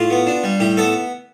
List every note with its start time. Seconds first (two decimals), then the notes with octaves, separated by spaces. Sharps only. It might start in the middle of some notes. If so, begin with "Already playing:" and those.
Already playing: A2 F4
0.10 B3
0.27 D4
0.44 G3
0.60 A2 G4
0.77 B3 A4